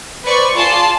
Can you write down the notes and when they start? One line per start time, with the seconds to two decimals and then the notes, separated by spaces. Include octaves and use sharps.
0.24 B4 C5 D5 C#6
0.55 F4 G#4 D5 A5 C6